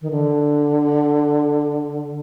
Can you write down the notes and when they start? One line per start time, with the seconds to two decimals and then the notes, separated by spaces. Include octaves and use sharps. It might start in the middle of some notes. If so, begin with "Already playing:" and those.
0.02 D#3
0.11 D3